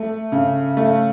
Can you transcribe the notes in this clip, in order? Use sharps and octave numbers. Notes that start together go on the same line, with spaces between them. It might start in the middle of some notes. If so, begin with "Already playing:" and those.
Already playing: A3
C#3
A3